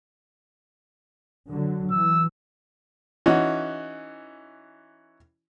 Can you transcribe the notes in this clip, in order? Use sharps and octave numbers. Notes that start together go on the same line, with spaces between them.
D3 F#3
E3 E6
E3 C#4 D#4 F#4